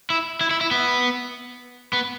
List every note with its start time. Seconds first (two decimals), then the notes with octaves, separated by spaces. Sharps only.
0.10 E4
0.41 E4
0.51 E4
0.61 E4
0.71 B3
1.93 B3